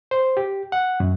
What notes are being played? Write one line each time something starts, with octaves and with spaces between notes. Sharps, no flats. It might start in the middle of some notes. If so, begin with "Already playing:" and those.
C5
G4
F#5
F#2